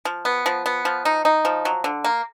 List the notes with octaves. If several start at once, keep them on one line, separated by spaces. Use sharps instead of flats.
F3
B3
F3
B3
F3
D#4
D#4
F3
F#3
D3
A#3